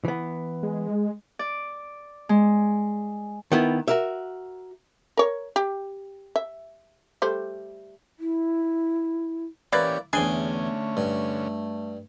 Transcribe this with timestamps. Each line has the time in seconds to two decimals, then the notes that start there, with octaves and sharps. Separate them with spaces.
0.05 E3 B3
0.63 G#3
1.39 D5
2.29 G#3
3.52 D#3 B3 E4
3.88 F#4 A#4 E5
5.17 A#4 C#5
5.56 G4
6.36 E5
7.22 G3 A3 C5
8.19 E4
9.73 E3 A#3 C#4 E4 G4 B4 D5
10.13 E2 D3 A3 C#4 D4 G#4 G5 G#5
10.97 G2